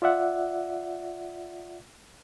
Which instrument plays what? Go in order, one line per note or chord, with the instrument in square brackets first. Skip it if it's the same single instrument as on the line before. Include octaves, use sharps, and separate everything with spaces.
[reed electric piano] F4 D5 E5 F#5